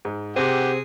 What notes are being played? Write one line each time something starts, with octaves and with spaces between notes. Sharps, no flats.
G#2
C3 C4 G4 G#4 F#5